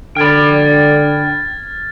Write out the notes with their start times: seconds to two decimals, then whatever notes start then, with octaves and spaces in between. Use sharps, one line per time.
0.16 D3 G5 B5 F6 G#6 A6